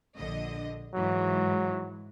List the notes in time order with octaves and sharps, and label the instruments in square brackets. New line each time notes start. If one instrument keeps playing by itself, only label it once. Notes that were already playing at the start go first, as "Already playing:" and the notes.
[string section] A#1 D3 D#5
[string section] G#2 E3 [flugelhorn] F#3